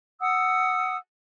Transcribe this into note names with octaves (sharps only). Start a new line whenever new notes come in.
F#5 D#6 E6